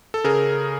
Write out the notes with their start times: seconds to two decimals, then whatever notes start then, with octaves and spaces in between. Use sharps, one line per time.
0.14 A4
0.24 C#3 G#4 A#4